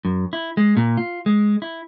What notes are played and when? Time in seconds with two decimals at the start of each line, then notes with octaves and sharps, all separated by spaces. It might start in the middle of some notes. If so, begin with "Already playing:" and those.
0.05 F#2
0.33 E4
0.57 G#3
0.77 A#2
0.97 F4
1.26 G#3
1.62 E4